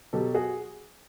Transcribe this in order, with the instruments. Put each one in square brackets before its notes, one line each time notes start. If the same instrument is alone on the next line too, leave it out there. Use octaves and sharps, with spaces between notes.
[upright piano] B2 F#3 G4 A4
F#4 G#4